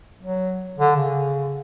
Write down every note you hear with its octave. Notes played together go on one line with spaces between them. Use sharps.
F#3
D3
C#3